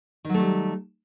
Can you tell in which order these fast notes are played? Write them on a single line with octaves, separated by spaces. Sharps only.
D#3 F#3 A3 G3